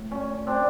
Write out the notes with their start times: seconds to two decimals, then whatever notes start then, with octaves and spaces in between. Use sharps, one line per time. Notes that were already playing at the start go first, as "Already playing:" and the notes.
Already playing: A2
0.11 A#2 C#4
0.46 A#2 C4 D4